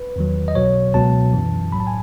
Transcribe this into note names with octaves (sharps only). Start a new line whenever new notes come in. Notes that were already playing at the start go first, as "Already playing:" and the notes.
Already playing: B4
E2 D#3 F#3
D#5
B1 B2 F#3 C#5
C#2 B2 F#3 A5
F#2 E3
B1 A2 F#3 B5
A5
G#5